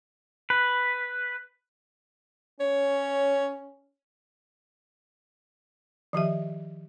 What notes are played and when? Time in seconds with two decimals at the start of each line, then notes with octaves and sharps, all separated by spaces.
0.50 B4
2.60 C#4 C#5
6.13 D#3 F3 G4 E5